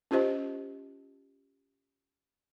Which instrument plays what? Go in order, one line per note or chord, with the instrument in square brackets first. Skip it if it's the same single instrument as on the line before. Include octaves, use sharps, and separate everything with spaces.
[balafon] C#4 F4 G4 C5 D#5